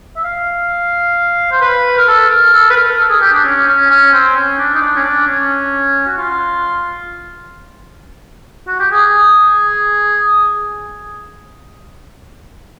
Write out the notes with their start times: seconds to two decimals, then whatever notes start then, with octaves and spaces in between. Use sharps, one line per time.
0.16 E5
0.24 F5
1.51 C5
1.61 B4
1.97 A#4
2.07 A4
2.29 A#4
2.53 A4
2.70 B4
2.76 A#4
2.99 A4
3.10 G#4
3.21 G4
3.32 D4
3.44 C#4
3.67 C#4
3.90 C#4
4.13 C4
4.35 C#4
4.58 D4
4.75 D#4
4.81 D4
4.96 C#4
5.04 D4
5.27 C#4
6.07 F#4
6.18 F4
8.67 F#4
8.80 G4
8.92 G#4